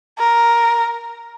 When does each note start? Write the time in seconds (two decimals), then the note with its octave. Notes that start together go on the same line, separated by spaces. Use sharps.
0.19 A#4